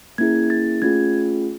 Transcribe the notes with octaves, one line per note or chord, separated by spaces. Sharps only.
A#3 C#4 E4 G#4 G#6
A6
A3 C#4 F4 G#4 G#6